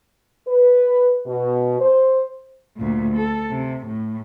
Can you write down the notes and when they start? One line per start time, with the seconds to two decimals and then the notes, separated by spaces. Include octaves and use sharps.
0.48 B4
1.26 B2
1.80 C5
2.77 D2 A#2
3.17 A4
3.50 C3
3.87 A2